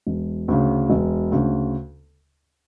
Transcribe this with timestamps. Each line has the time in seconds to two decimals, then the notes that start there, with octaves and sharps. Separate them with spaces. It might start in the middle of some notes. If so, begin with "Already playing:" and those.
0.07 E1
0.48 D2 C#3
0.90 E1
1.32 D2 C#3